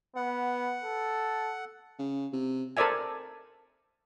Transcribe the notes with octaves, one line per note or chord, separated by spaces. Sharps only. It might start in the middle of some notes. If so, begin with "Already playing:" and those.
B3 F#5
A4
C#3
C3
A4 A#4 C5 D5 E5 G#5